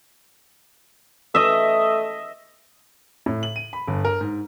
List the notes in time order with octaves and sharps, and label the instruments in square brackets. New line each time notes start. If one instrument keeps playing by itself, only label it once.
[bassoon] A3 [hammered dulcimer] D#5 E5
[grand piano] A2
F#7
D#7
B5
G1
A#4
G#2